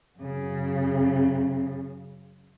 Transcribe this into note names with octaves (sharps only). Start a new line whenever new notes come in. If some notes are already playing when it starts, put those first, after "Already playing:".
F#2 C#3